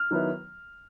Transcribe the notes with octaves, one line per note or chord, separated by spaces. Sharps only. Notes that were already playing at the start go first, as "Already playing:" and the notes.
Already playing: F6
D#3 F#3 B3 E4